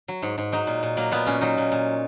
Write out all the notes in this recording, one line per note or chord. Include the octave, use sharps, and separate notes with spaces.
F#3
G#2
G#2
F#3 D#4
A#2
A#2
F#3 A#3
A#2 B3
A#2 C#4
F#3 D#4
A#2
A#2